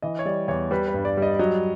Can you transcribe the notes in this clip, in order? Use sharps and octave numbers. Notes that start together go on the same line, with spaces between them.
E3 D#5
C#5
G3 D5
E2 C#5
G3 B4
B4
G2
D5
G3
D#5
F#3 D#5